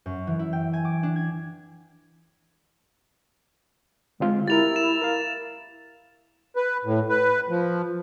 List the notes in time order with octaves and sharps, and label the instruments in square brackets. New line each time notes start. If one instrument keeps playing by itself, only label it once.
[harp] F#2
E3
E4
G5
G#5
D6
D4
G#6
[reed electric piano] D3 C4 F4 [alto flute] G#3
[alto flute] E4 [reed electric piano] G4 A#4 [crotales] A6 F7
[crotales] E7
[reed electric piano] A#4 F5
[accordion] B4
A2
B4
F3